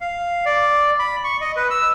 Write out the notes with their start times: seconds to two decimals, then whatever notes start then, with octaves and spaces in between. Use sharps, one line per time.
0.01 F5
0.45 D5
0.99 B5
1.24 C#6
1.41 D#5
1.56 B4
1.70 E6